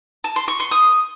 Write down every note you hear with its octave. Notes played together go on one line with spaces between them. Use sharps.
A5
C6
C#6
C6
D#6